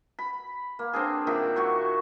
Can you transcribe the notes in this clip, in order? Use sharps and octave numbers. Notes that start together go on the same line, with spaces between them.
B5
A#3
C4 D4 G#4
A#2 D#3 G4 E5
F#4 C#5 G5 C#6